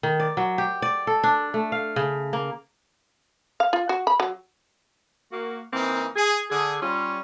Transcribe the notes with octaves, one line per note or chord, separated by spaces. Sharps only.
D#3
D5
F#3
G4
D5
A4
D4
A3
F5
C#3
A#3
F5
F4
F#4
B5
F#3
A#3 F#4
E3 A#3 C4 D#4
G#4
D3 G#4
G3 C#4 F4